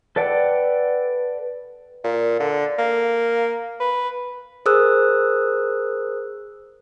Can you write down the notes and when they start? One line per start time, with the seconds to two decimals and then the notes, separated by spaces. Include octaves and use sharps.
0.16 A4 B4 D5 F#5 G5
2.04 A#2
2.40 D3
2.78 A#3
3.80 B4
4.66 G#4 A#4 C5 D#6 E6 F#6